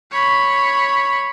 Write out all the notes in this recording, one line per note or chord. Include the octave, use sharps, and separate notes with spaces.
C#5 B5